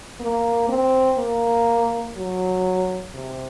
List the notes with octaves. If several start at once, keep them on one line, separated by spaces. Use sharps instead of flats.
A#3
C4
A#3
F#3
C3